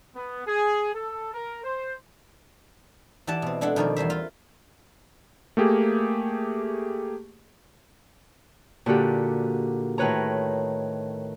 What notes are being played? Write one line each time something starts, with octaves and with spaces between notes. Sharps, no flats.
B3
G#4
A4
A#4
C5
E3 G4 D5 F#5 A5
B2 C4
G#3 D4 A4 F#5
B2 D#3 F3 A#3 F4 D5
E2 G3 C5 E5
F4
A3 A#3 G4 G#4
A#2 D3 F#4 G4
A2 D#3 B4 C#5 A#5